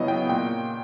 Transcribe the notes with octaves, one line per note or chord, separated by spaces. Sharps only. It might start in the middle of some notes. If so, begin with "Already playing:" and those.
Already playing: C#3 F#3 B3 E4 D#5
G5
A#2 G5